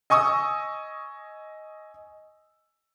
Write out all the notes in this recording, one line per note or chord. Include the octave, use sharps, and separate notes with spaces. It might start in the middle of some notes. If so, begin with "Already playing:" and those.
D#5 G#5 C#6 D#6 E6